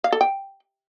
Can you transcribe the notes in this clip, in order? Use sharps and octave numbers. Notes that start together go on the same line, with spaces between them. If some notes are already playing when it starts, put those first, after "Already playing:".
F5
A4
G5